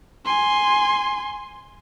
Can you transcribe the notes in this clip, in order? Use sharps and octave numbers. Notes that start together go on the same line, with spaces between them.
G#5 C6